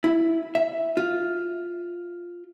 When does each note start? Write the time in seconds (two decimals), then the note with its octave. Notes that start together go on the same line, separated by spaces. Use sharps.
0.04 E4
0.55 E5
0.97 F4